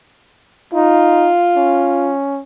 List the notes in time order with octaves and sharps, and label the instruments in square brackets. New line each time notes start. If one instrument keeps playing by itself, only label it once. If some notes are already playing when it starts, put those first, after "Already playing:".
[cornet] D#4 [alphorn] F4
[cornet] C#4